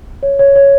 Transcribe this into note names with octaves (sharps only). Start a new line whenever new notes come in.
C#5
C#5
C#5